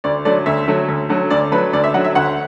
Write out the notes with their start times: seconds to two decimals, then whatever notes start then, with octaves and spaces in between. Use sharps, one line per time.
0.04 D2 D5
0.25 D3 F#3 A3 D5
0.46 D2 E5
0.68 D3 F#3 A3
0.88 D2
1.09 D3 F#3 A3
1.30 D2 D5
1.52 D3 F#3 A3 B4
1.73 D2 D5
1.84 E5
1.94 D3 F#3 F#5
2.04 E5
2.15 D2 F#5